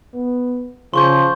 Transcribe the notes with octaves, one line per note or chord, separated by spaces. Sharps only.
B3
C#3 F3 C6 C#6 G6